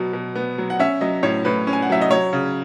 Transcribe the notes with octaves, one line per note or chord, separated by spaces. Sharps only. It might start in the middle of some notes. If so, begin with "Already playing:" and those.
Already playing: B2 F#3 B3
B2
B3
F#3
F#5
C#4 E5
F#3 D#5
A2 C#5
A2 B4
C#4
G#5
F#5
F#3 E5
D#5
F#3 C#5
C#3